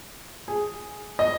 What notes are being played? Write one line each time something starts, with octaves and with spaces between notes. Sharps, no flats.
G#4
D#5